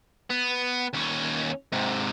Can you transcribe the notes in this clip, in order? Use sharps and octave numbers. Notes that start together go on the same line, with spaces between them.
B3
D#2 C#4
G#2 C3